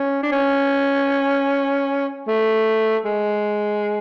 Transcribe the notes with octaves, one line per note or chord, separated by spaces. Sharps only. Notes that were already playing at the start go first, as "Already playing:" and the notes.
Already playing: C#4
D4
C#4
A3
G#3